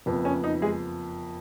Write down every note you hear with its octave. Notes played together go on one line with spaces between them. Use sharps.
F#1 F2 F3 B3
C#4
D#4
G#3 G#4